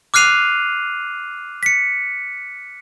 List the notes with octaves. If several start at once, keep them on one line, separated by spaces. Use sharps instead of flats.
D6 F6 F#6 C7 D#7 F7
B6 C#7